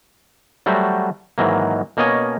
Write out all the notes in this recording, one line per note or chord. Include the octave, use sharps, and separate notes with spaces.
F#3 G3 A3 F#4 C5
G#2 D#3 E3 F#3 A#3
B2 A#3 C#4 C#5 D#5 G#5